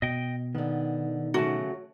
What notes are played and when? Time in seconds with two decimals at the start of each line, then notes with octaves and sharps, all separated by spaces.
0.02 B2 D#5 G5
0.55 D3 D#3 B3
1.34 C#3 F#3 A3 F#4